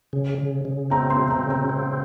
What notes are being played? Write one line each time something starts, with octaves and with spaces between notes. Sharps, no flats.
C#3
C#3
C#3
C4 A#5
C6
C4
A#5
C#3
A#5
C4